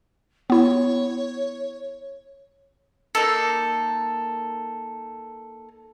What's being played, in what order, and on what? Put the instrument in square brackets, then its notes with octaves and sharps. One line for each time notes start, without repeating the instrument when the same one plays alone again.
[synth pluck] B3 E4 [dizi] C#5
[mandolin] A#3 D#4 A4